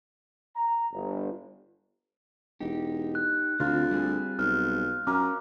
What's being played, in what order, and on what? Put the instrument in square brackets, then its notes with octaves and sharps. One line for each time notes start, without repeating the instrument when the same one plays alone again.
[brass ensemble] A#5
G1
[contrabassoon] E1 [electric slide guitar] D#4 G4
[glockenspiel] F#6
[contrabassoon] D2 [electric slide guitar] D3 C4 [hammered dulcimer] F4
[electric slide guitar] G3 C4 G#4
[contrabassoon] B1 [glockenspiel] F6
[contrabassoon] F#2 [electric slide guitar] C#4 [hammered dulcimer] A#4 [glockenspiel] D6